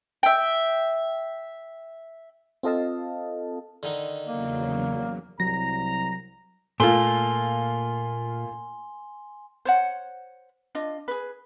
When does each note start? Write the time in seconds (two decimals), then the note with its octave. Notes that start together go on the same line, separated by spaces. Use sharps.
0.23 E5 G5
2.63 C4 F4 A4 D#5 F5 A5
3.83 D3 D#3 D#4
4.28 E2 C#3 F#3 A#3
5.40 C2 F#3 A#5 A#6
6.80 A#2 A3 A#3 F4 G#5 C6 G7
9.65 C5 C#5 F#5
10.75 D4 F4 D#5
11.08 G#4 B4